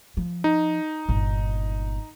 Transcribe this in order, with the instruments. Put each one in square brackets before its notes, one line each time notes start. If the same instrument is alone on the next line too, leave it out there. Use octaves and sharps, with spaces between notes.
[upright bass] F3
[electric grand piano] D#4
[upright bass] G1 A#2